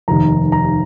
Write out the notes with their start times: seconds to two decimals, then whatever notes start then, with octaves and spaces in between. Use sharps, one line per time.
0.08 F1 D#2 D#3 A#5
0.52 A#5